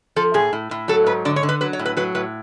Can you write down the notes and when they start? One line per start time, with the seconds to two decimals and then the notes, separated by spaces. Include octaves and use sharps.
0.16 F3 A4
0.34 A2 G#4
0.53 A2
0.71 A2
0.88 F#3 A4
1.06 G#2 B4
1.25 D3 D5
1.36 C#5
1.43 D3
1.49 B4
1.61 F#3 B4
1.73 C#5
1.79 A2
1.85 B4
1.97 F#3 B4
2.15 A2 B4